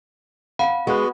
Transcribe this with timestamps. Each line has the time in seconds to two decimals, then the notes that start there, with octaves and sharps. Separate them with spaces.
0.59 F5 F#5 B5
0.87 G#3 B3 F#4